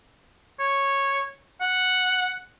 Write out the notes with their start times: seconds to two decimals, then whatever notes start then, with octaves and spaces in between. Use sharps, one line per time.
0.60 C#5
1.61 F#5